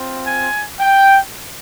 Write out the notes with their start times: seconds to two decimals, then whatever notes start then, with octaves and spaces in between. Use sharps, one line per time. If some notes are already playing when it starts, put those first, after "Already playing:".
Already playing: C4 F4
0.26 G#5
0.80 G5